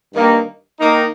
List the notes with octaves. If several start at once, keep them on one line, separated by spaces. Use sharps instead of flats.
G2 D#3 A#3
D#3 A#3 D#4